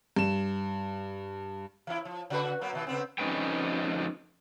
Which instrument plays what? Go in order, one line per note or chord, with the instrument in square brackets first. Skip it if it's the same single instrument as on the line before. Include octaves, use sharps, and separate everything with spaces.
[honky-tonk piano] G2 E7
[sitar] E3 E4
F3
C#3 F#4 B4
F#3 A#3 B3
B2 D#3
C#3 B3 C4
[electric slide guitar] F2 C#4 D#4 B4 G5